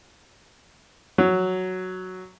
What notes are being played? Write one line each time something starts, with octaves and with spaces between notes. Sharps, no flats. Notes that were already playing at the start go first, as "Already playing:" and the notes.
F#3